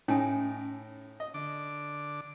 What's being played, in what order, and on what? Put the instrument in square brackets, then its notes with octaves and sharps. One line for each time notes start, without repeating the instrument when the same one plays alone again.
[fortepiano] A2 D#4 [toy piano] C#4 G#5
[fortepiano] D#5
[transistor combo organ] D3 D6